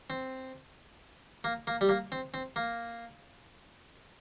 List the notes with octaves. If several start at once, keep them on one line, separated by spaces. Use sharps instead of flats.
C4
A#3
A#3
G3
A#3
C4
C4
A#3